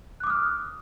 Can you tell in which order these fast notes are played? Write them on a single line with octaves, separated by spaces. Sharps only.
F#6 D6 D#6 F6